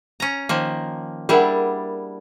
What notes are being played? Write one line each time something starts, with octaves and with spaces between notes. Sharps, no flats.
C#4 A#5
D#3 F3 A#3
G3 D4 E4 G#4 A#4 F#5